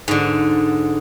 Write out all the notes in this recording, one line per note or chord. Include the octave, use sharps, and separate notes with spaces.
G#2 D3